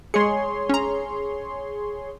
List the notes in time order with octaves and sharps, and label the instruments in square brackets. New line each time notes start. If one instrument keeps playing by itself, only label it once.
[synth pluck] G#3 C#7 [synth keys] G#4 C#5 C6
[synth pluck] C#4 A#5